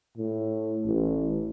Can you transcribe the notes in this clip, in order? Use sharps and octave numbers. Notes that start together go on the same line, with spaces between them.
A2
A1